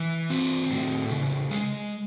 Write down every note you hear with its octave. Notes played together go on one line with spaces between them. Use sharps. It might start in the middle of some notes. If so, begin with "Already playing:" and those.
Already playing: E3
C4
A2
C#3
G#3